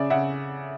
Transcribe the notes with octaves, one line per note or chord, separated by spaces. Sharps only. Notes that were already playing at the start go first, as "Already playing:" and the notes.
Already playing: C#3 D5 E5
C#3 E5 F#5